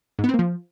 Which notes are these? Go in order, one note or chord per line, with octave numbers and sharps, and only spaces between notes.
G#2
B3
C4
A#3
F3